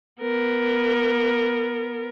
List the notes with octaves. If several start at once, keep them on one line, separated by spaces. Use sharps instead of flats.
B3 A#4